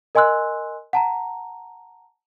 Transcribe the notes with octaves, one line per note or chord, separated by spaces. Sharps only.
A#4 D#5 G#5 C6 E6 F#6
F#5 A5 A#5